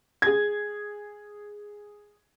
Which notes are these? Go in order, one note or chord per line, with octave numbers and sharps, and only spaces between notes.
G#4 G#6